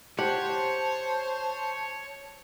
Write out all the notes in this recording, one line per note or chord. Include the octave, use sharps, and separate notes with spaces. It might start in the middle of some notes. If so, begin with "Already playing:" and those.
G4 C5 C#5 F#5 A5